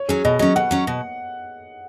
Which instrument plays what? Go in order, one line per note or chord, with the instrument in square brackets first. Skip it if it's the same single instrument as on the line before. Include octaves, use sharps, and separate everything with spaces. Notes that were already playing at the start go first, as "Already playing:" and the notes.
Already playing: [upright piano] C#5
[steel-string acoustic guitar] F#3 C#4 [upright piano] G#4
[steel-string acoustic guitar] B2 [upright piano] D#5
[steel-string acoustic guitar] F#3 C#4 [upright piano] D#5
[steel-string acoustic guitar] B2 [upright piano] F#5
[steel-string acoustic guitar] F#3 C#4
B2